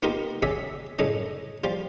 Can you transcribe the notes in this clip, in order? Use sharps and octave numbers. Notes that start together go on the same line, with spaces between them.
A#3 B3 D#4 F4 G4 A#4
C#4 F#4 G#4 D5 E5
F#2 A2 C#3 A3 D#5
F3 G3 F4